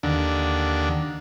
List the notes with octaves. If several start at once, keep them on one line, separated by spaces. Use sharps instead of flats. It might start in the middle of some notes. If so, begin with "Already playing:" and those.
D#2 D3